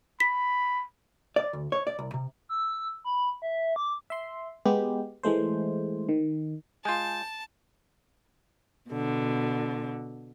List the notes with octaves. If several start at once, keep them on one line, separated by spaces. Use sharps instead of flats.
B5 B6
D5
D2
C#5
D5
C2
C3
E6
B5
E5
D6
E5 C6
G#3 B3 G4
E3 G#3 A3 C5
D#3
G#3 F4 G#5 A5 G6
B2 D3